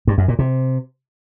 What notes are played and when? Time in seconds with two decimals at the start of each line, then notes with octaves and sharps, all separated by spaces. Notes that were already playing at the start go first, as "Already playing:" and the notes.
0.07 G2
0.18 F#2
0.28 A#2
0.39 C3